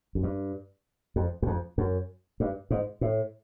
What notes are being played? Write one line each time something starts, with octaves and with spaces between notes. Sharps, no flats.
F#2
G2
F2
E2
F2
F#2
G2
G#2
A2